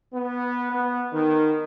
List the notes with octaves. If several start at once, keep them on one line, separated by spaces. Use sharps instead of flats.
B3
B3
D#3